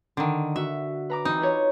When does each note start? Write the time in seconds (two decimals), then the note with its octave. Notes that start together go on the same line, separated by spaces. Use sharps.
0.17 D3 D#3
0.56 F#4 E5
1.10 B4 A#5 D6
1.25 E3 C4 D#4
1.40 F4 B4 C#5